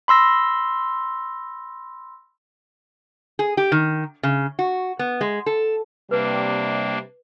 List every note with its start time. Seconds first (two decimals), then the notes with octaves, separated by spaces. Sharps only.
0.08 B5 C6 E6 A#6
3.39 G#4
3.57 G4
3.72 D#3
4.23 C#3
4.59 F#4
4.99 B3
5.21 G#3
5.46 A4
6.11 C3 G3 A#3 D4 B4